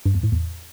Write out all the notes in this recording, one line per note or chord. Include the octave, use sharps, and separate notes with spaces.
G2
E2
A2
E2